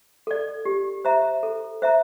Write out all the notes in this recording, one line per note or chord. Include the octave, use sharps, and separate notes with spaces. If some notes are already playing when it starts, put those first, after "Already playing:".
A4 D5
G4
C5 E5 A#5
A4
C5 E5 A#5